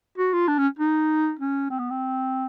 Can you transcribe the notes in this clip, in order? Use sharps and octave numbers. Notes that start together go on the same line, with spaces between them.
F#4
F4
D4
C#4
D#4
C#4
C4
B3
C4